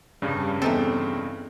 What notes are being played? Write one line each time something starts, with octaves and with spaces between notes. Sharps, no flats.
F1 G2 C#3 G3
E2 E3 C4 D#4 A4